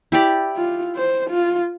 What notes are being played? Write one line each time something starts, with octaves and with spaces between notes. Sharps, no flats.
E4 G4 D5
F4
C5
F4